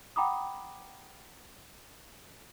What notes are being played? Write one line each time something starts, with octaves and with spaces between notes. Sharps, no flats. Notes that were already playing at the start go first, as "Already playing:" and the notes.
F#5 G5 A#5 B5 D6 D#6